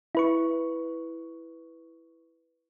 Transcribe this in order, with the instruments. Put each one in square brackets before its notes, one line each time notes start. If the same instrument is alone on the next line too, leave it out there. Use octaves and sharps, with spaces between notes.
[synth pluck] E4 B4 C#6